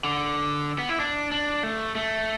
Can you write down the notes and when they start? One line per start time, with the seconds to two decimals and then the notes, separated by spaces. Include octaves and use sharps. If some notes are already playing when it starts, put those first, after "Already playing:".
0.04 D3
0.79 B3
0.89 E4
1.00 D4
1.32 D4
1.63 A3
1.95 A3